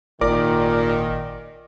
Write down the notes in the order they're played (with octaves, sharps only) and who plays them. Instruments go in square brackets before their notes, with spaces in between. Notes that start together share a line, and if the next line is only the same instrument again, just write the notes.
[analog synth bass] G#1 [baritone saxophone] A#2 [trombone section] D#3 [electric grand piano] A#4 D5 D6